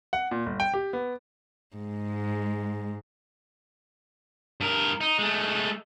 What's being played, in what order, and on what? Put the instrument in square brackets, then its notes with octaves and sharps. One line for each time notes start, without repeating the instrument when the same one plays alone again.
[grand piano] F#5
A#2
G1
G5
G4
B3
[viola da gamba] G#2 [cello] G#3
[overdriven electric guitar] G2 A#4
D#4
G#3 A3